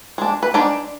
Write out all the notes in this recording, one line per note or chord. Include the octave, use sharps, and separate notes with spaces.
G#3 D4
B4
G#3 D4 D#4 D5